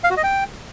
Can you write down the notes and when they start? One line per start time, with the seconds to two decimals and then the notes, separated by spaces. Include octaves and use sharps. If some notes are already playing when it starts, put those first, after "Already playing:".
0.04 F5
0.10 F#4
0.17 D#5
0.24 G5